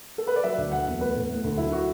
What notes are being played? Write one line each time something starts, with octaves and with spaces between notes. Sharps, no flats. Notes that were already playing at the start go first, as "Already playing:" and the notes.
A4
B4
D5
F#3 E5
D2
F#3 F#5
E2
A3 B4
A2
A3
D2
F#3 E4
F#4